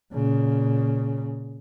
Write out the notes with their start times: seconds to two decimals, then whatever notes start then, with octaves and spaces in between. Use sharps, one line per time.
0.13 A#2 C#3